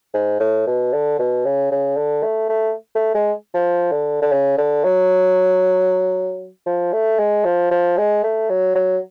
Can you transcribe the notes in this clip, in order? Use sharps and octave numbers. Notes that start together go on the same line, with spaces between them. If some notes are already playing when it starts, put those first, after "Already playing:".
G#2
A2
B2
D3
B2
C#3
C#3
D3
A3
A3
A3
G#3
F3
D3
D3
C#3
D3
F#3
F3
A3
G#3
F3
F3
G#3
A3
F#3
F#3